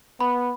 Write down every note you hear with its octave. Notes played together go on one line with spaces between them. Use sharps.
B3 B5